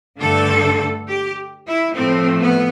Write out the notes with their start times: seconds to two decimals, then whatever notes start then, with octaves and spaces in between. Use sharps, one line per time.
0.20 G2 D3 A3 A4
1.08 G4
1.68 E4
1.96 A2 F3 A3 C4
2.41 B3